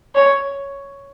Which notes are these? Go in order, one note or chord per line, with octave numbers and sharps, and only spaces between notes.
C#5